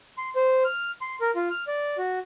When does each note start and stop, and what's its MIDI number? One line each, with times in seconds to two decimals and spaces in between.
0.18 0.30 84
0.36 0.64 72
0.65 0.91 89
1.01 1.16 84
1.21 1.31 70
1.36 1.49 65
1.50 1.64 89
1.67 1.97 74
1.98 2.19 66